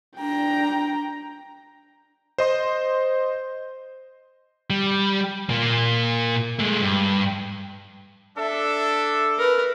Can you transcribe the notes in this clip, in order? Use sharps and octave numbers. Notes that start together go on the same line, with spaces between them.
D4 G5 A#5
C5 D#5 C6
G3
A#2 A#3
G#3 A3
G2
D4 A4 E5
A#4 B4